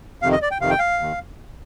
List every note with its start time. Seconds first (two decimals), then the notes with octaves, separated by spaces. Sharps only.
0.22 F2 C3 D#3 F5
0.32 D#5
0.42 D5
0.51 G5
0.60 F2 C3 D#3 F5
0.70 G5
0.79 F5
0.99 D#2 D#3